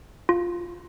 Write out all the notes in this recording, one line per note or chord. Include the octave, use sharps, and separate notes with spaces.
F4